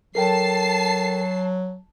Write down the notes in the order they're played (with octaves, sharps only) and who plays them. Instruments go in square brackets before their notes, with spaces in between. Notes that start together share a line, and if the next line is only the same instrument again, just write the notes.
[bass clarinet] F#3 [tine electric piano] A4 A#4 G5 [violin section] A5 C7